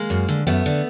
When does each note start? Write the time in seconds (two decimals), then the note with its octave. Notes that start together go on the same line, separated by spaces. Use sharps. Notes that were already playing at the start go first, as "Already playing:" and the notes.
Already playing: G#3 A#3
0.10 F#2
0.28 D3
0.47 F#2 A3 B3
0.66 D3